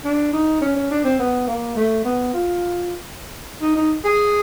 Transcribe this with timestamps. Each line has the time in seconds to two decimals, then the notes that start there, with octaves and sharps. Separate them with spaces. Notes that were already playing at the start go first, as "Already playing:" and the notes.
0.05 D4
0.33 D#4
0.61 C#4
0.76 C#4
0.91 D4
1.04 C4
1.19 B3
1.47 A#3
1.76 A3
2.05 B3
2.33 F4
3.61 D#4
3.76 D#4
4.05 G#4